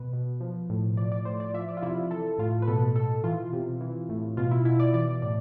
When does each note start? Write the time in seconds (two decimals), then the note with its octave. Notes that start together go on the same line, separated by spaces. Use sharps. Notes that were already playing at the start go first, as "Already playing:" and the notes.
Already playing: B2 B4
0.13 B2
0.40 F3
0.70 A2
0.97 F3 D5
1.12 D5
1.25 A2 C5
1.40 D5
1.54 F3 E5
1.69 D5
1.77 F4
1.83 C3 E4
1.97 F4
2.11 E3 A4
2.38 A2 F4
2.62 B4
2.68 B2 A4
2.95 B2 A4
3.24 E3 F4
3.53 C3
3.81 E3
4.09 A2
4.37 B2 F4
4.51 E4
4.65 B2 E4
4.80 D5
4.94 E3 D5
5.22 A2 D5